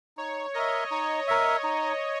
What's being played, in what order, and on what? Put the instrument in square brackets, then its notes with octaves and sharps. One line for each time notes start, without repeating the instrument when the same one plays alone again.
[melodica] D#4 [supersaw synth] C#5
[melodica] A#4 E5 [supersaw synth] D#5
[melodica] D#4 [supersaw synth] C#5
[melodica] A#4 E5
D#4